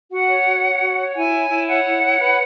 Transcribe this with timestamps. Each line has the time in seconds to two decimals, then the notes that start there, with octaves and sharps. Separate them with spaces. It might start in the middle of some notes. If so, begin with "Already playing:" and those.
0.11 F#4 F#5
0.29 C#5
0.47 F#4
0.64 C#5
0.81 F#4
0.98 C#5
1.16 E4 G#5
1.34 C#5
1.51 E4
1.68 C#5 F#5
1.85 E4
2.03 C#5
2.20 B4